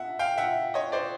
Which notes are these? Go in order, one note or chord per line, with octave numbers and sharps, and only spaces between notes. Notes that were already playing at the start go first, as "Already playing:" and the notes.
Already playing: E5 F#5
F5 G5
E5 F#5
C#5 D#5
C5 D5